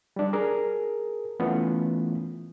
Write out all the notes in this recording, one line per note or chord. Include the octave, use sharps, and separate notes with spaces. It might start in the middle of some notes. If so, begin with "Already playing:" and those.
G3 D4
G#4 A#4
E3 A3 B3 C#4 E4 F4